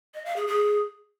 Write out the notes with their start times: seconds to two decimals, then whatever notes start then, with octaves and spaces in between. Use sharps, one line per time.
0.14 D#5
0.25 F5
0.36 G#4
0.47 G#4